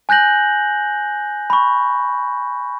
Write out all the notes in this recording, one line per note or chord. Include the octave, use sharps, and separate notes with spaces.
G#5 F#6 G6 A#6 F#7
B5 C#6